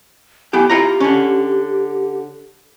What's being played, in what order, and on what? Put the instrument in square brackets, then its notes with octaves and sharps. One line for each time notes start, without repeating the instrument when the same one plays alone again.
[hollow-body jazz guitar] B3 E4 G4 [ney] G#5
[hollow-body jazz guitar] E4 F4 A#5 [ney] G4
[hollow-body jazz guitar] D3 C#4